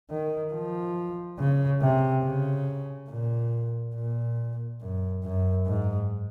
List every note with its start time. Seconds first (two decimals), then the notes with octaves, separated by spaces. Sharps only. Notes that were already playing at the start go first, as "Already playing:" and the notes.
0.10 D#3
0.53 F3
1.38 C#3
1.81 C3
2.24 C#3
3.09 A#2
3.95 A#2
4.81 F#2
5.24 F#2
5.66 G#2